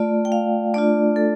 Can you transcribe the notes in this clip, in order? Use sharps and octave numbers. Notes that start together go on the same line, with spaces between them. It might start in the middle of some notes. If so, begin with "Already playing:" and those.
Already playing: A3 F4 D5
G5
F5
A3 D4 F4 D5
A4